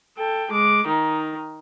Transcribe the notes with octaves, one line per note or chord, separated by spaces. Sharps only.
A4 G5
G#3 D6
D#3 D#4